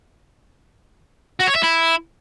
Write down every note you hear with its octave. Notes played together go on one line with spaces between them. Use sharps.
F#4
C#5
E5
E4